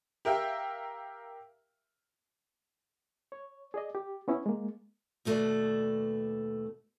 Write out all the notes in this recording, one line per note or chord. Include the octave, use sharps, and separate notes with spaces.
G4 A#4 E5 F5 G5
C#5
G#4 D5 D#5
G4
B3 C#4 E4
G#3 A#3
D#2 B2 A3 F4 B4 D5